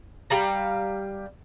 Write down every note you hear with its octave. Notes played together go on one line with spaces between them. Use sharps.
G3 F5 A#5